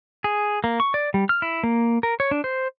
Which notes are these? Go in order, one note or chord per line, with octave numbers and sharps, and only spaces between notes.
G#4
A#3
C#6
D5
G3
F6
E4
A#3
A#4
C#5
D4
C5